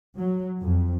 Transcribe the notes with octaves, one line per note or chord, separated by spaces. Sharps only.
F#3
F2